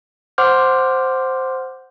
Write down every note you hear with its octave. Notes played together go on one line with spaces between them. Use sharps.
C5 F#5 C6 D6 F6 G6